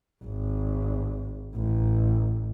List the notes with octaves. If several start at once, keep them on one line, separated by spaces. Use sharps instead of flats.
G#1
A1